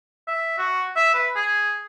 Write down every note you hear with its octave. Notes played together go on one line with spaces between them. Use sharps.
E5
F#4
E5
B4
G#4